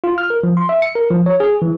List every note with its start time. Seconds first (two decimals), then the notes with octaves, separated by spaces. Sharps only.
0.04 F4
0.18 F6
0.30 A#4
0.43 F3
0.57 C6
0.69 E5
0.82 C#7
0.95 A#4
1.10 F3
1.26 C#5
1.40 G#4
1.62 E3